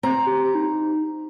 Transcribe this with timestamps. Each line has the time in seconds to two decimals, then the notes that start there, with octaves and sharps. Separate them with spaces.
0.03 C4 A#5
0.26 G4
0.55 D#4